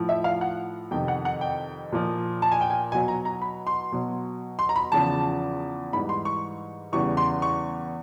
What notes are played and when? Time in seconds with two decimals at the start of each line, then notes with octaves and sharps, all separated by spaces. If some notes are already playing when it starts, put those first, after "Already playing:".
Already playing: A2 F3
0.09 E5
0.24 F5
0.41 F#5
0.91 F2 C3 D#3 G5
1.08 F#5
1.25 F#5
1.41 G5
1.92 A#2 F3
2.42 A5
2.52 G#5
2.61 G5
2.70 G#5
2.92 B2 F#3 G#5
3.08 A#5
3.25 A#5
3.42 B5
3.67 C6
3.92 B2 F#3
4.59 C6
4.69 A#5
4.76 B5
4.92 E2 C#3 F3 A5
5.93 G#2 E3 G3 B5
6.09 C6
6.25 C#6
6.92 E2 C#3 E3 G3 C#6
7.17 C6
7.42 C#6